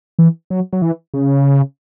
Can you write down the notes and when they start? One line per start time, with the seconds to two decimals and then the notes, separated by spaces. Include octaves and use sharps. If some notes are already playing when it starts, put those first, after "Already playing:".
0.19 E3
0.50 F#3
0.73 F#3
0.82 E3
1.14 C#3